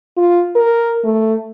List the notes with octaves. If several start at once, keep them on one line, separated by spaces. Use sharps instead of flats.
F4
A#4
A3